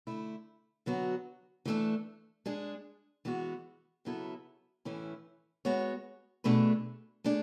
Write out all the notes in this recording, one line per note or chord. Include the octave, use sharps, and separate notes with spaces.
D3 A3 E4
D3 F#3 B3 F#4
E3 A3 D4 A4
G#3 D4 G#4
E3 G#3 B3 F#4
C#3 F#3 B3 E4 A4
A2 E3 A3 C#4 E4
G#3 B3 F#4 C#5
B2 A3 D4 G#4 B4
A3 D4 G#4